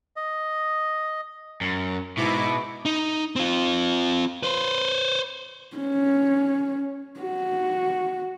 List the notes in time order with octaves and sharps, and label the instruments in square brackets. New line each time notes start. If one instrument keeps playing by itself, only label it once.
[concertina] D#5
[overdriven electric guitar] F#2
[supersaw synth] G#2 E4 D6 [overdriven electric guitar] B2
[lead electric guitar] D#4
C4 F4
B4 C5
[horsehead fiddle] C#4
F#4